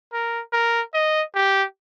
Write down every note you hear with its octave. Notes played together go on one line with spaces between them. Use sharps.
A#4
A#4
D#5
G4